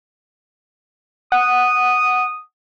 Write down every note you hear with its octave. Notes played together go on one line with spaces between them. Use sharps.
F#5 D#6